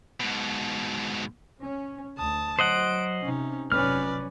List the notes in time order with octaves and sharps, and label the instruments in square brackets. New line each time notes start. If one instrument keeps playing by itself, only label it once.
[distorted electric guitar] G#2 B2
[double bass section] C#4
[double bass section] D2 [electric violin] A5 D#6
[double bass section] F#3 [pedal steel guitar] C5 D#5 F#5 [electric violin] D7
[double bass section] C3 [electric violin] C#4 D#4
[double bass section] F1 F#3 C#4 [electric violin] B4 D5 [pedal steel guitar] F6